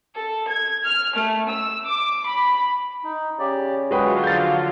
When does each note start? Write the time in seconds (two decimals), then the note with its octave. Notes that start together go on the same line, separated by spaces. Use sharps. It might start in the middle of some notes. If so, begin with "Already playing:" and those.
0.15 A4
0.48 G#6
0.85 F6
1.16 A3
1.49 E6
1.86 D6
2.27 B5
3.04 D#4
3.39 C#3 G4 D5
3.91 D3 F#3 G#3 F4 F#4 G#4 B4 G5
4.24 F3 G6 A6